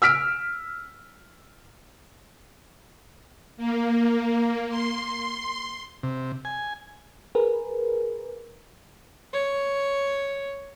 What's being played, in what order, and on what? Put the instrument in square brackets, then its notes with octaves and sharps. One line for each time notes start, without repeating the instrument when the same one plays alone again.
[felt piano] E6 F6 B6 D7
[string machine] A#3
C6
[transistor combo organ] C3
G#5
[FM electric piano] G#4 A#4 B4
[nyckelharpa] C#5